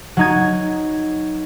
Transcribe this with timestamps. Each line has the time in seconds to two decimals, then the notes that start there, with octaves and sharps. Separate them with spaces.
0.17 F#3 D#4 G#6